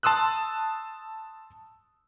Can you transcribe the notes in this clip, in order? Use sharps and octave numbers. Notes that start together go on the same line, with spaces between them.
A5 C6 D#6 E6 F#6